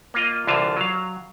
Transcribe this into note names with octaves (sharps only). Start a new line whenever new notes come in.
A#3 F4 D#5
C2 D3 E3 F4 A5
F#3 F5